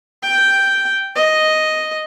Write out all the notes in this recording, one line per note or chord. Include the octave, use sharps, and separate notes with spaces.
G5
D#5